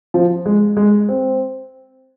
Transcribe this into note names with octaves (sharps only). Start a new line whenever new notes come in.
F3
G#3
G#3
C4